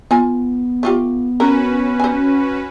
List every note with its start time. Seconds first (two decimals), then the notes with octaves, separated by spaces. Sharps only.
0.11 B3 F4 G#5
0.83 A3 F4 G4
1.40 C#4 F#4 A#4 B4
2.00 C5 G#5